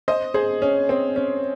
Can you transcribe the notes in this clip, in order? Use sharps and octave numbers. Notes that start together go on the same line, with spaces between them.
C5 D#5
G#4 C5
C#4
C4
C#4